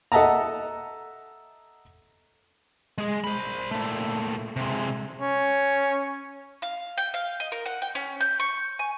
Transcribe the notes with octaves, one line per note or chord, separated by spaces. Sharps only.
A4 D#5 E5 F#5 A5 A#5
G#3 G#4
C5 B5
A#2 A3
C3 G#3
C#4
F5
G5
F5
D#5
A#4
F#5
G5
C#4
G6
C#6
G#5